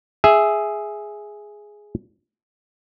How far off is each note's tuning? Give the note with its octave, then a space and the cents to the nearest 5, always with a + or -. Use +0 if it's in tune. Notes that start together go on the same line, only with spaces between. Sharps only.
G#4 +0 E5 +0